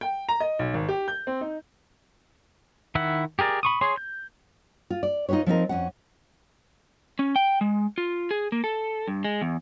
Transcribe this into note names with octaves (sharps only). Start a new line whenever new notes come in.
G5
A#5
D#5
B1
G#1
G4
G6
C4
D#4
D#3 E4 E5 F#5
G4 G#4 A#4 D5
B5 C#6 D#6
G#4 C#5 C6
G6
F4
D5
D#4 F4 G4 B4 C#5
F3 C4 D#4 A#4
F2 C#4 F#5
C#4
G5
G#3
F4
G#4
A#3
A4
G2
G#3
E2